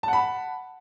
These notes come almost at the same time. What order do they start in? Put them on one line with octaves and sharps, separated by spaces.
A5 F#5 B5